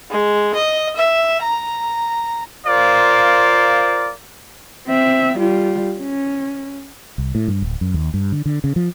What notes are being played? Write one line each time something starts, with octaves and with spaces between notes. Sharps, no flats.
G#3
D#5
E5
A#5
F4 A#4 C5 D5 F5
C4 E5
G3 F4
C#4
C2
A2
G2
D1
F#2
D#2
G2
D3
D3
C#3
F3